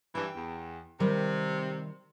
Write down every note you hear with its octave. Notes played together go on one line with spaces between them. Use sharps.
G2 E3 G5
E2
C3 D#3 G3